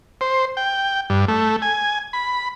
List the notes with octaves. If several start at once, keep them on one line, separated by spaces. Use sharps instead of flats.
C5
G5
G2
A3
G#5
B5